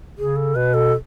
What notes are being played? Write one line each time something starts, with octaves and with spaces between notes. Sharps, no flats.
C#3 G#4
A4
B2 B4
A4